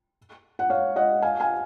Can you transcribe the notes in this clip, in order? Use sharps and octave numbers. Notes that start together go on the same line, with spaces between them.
F#5
C#5 F5
D#5 F#5
F5 G#5
F5 G#5